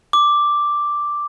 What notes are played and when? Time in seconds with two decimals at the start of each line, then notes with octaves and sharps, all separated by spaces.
0.13 D6